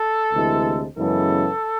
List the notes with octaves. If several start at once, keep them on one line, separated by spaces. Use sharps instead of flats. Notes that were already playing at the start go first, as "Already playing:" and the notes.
Already playing: A4
D2 C3 E3 G#3
F#2 C#3 E3 G#3 B3 A4